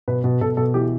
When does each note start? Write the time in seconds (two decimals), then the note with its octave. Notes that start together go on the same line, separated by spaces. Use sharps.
0.08 B2 B4
0.24 B2
0.41 B2 A4
0.57 B2 A4
0.74 E3 G4